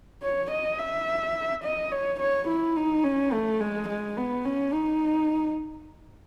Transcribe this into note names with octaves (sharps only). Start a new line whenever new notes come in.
C#5
D#5
E5
D#5
C#5
C#5
E4
D#4
C#4
A3
G#3
G#3
B3
C#4
D#4